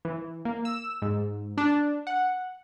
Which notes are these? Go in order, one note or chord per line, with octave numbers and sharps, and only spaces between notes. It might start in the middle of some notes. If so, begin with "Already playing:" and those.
E3
A#3
E6
G#2
D4
F#5